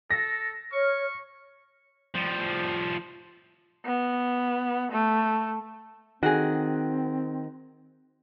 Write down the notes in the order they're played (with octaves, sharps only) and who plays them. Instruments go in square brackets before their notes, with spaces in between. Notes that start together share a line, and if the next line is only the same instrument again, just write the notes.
[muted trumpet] A4 [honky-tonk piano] A#6
[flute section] C#5 F6 [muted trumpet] C#6
[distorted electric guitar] F3 G3
[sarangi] B3
A3
[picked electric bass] D#3 [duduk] C4 [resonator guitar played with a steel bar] F#4 G#4